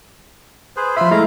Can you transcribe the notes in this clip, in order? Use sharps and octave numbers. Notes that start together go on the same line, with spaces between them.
G#4 B4 C5
F3 F4 E5 B5 C6
G#3 A3 E4 F5 A#5